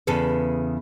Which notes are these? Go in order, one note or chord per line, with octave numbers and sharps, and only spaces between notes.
E2 C#3 A4 B4